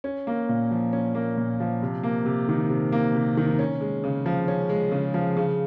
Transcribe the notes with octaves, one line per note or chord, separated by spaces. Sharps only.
C#4
A#3
A#2
F3
C#4
A#3
A#2
F3
C3
A#3
C3
D#3
C3
A#3
C3
D#3
C#4
G#3
C#3
F3
C#4
G#3
C#3
F3
C#3